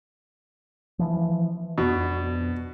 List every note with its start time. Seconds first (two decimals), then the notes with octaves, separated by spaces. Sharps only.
0.99 E3 F3
1.78 F2 B2 B3 D4